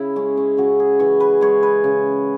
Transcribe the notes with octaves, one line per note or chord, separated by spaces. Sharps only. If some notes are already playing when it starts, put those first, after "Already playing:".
Already playing: C#3 E4
G#3 C#4
C#4
C#3 F#4
G#4
E3 C#5
B4
G#3 C#5
B4
C#3